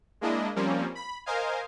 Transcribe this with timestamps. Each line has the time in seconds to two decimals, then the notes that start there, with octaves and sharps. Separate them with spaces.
0.21 G#3 A#3 D4 E4 D#5
0.56 F3 G3 A#3 C4 C#4
0.95 B5
1.26 A#4 C5 D#5 F5 G#5